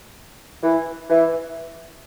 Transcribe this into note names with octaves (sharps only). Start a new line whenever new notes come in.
E3
E3